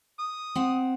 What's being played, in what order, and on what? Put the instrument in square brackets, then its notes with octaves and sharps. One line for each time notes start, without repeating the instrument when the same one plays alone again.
[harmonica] D#6
[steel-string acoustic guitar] C4 F#5